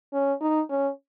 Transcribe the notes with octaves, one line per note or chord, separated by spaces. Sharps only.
C#4
D#4
C#4